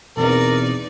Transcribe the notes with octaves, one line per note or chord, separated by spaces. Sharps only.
E2 B2 E3 C4 D#4 A#4 D5